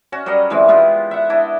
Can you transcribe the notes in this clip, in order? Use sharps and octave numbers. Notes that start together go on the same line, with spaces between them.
C#4 F#4
F#3 G3 A#4 D#5
E3 G3 G#3 C4
G#3 B3 F4 G4
E5 F#5
D4 E4 D5 D#5